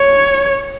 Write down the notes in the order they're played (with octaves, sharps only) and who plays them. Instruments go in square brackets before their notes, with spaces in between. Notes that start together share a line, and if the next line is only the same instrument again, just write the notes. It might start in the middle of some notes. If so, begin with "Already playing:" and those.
Already playing: [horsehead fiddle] C#5